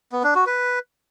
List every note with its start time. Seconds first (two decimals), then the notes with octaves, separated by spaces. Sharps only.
0.12 B3
0.24 D4
0.35 F#4
0.46 B4